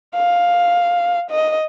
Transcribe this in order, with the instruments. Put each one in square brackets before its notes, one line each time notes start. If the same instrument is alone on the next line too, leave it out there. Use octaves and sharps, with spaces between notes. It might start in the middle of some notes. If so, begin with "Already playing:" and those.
[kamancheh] F5
D#5